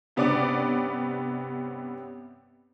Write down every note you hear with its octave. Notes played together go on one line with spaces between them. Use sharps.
G2 C3 B3 C#4 D5 D6